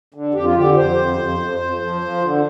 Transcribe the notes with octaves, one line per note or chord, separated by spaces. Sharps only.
D3
F2 G4
F4
D3 G4
F2 C5
F2
F2
F2
F2
F3
F3
D3